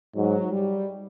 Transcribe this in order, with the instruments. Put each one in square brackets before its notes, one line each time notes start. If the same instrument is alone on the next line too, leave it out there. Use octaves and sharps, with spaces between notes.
[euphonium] G#2 [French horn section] F#3
[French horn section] G3